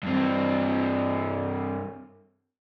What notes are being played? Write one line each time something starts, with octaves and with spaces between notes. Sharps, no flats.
G2 C4